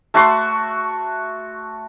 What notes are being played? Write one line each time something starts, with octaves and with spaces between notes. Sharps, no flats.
A3 F#4 C6